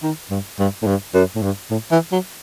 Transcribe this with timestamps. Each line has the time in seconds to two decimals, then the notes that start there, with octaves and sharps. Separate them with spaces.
0.03 D#3
0.30 G2
0.59 G2
0.82 A2
0.87 G2
1.14 F#2
1.35 A2
1.42 G2
1.70 A2
1.91 E3
2.12 F#3